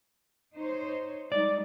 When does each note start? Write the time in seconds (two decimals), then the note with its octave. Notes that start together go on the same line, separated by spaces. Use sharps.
0.55 D#4 C5 C#5
1.32 G3 G#3 D#4 D5